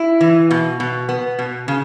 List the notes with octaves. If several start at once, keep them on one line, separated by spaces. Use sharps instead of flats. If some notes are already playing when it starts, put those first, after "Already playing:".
Already playing: E4
E3
B2
B2
B3
B2
C#3